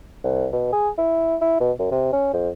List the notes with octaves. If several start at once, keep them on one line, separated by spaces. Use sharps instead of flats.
C2
B2
G#4
E4
E4
B2
F#2
C3
C#4
F2